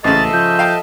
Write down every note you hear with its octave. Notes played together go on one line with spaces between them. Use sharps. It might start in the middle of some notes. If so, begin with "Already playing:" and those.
A1 G#2 C#3 A4 D#5 E5 A6
F3 G6
F5 G5 A5